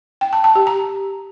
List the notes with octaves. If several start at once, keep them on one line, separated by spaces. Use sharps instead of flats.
G5
A5
A5
G4
A#5